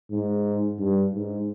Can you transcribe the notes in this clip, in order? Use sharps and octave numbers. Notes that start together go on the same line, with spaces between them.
G#2
G2
G#2